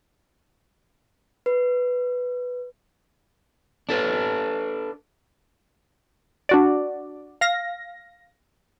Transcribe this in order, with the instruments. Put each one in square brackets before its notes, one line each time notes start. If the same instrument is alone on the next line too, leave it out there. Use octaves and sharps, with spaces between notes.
[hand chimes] B4
[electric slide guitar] D4 A4 B4
[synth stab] D4 F#4 D5
F5 A#6